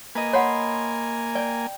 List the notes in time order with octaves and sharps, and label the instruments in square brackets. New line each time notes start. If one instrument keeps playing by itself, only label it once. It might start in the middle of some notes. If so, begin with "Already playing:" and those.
[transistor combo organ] A#3 G#5 [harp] B4 D#5
[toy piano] C#5 F#5 [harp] B5 C6
[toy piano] D5 [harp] G5